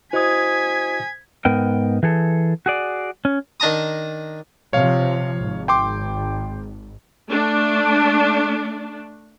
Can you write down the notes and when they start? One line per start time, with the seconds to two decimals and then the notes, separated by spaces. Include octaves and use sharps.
0.13 E4 F#4 C5 D#5 G#5 D#6 G#6 B6
1.45 G#2 B3 A#4 G5
2.03 E3 G#4 A4
2.66 F#4 G#4 D5
3.25 C#4
3.60 D#3 D4 A5 A#5 D#6
4.73 C3 F3 C#5 F5
5.40 G#1
5.68 G5 C6 D6
7.28 A3 D4